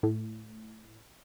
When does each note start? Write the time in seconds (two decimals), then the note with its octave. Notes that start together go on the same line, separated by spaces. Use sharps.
0.03 A2